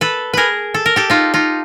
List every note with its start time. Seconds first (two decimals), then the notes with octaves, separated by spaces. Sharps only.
0.01 A4 B4
0.34 G#4 A#4 B4
0.74 A4
0.86 A#4
0.96 G4 A4
1.10 D#4 F4
1.34 D#4 F4